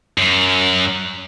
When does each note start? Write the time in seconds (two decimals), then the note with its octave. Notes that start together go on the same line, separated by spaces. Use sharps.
0.18 F#2